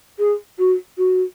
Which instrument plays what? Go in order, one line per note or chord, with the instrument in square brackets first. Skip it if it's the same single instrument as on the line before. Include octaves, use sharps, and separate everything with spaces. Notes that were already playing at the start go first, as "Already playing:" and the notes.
[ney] G#4
F#4
F#4